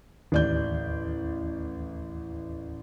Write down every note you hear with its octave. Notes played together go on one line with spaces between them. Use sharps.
A1 D#2 D5 G6